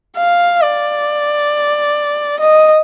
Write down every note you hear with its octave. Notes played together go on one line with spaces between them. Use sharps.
F5
D5
D#5